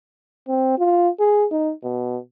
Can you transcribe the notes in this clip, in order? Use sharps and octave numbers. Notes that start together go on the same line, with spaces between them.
C4
F4
G#4
D#4
B2